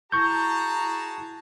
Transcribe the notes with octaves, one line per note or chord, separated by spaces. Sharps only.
E4 F#4 G#4 A5 A#5 C#6 G6